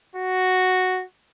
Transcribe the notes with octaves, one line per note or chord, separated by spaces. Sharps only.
F#4